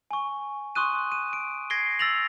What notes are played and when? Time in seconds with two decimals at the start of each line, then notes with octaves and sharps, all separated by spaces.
0.11 G#5 C#6
0.75 C6 C#6 D#6 F#6 D#7
1.12 D#7
1.33 D7
1.70 G#6 A#6 C7 D7 G7
1.99 E6 A6 A#6 F7 F#7